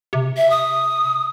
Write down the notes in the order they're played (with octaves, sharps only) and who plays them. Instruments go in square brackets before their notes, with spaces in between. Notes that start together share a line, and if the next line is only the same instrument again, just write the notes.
[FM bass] C3
[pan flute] E5
D#6